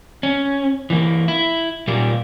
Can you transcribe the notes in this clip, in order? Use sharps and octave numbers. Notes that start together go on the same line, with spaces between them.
C#4
E3 A#3
E4
A#2 G3 A#3